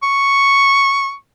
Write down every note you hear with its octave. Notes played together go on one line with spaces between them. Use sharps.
C#6